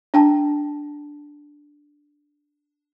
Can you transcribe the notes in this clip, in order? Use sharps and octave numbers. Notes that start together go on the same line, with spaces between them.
D4 G5 A5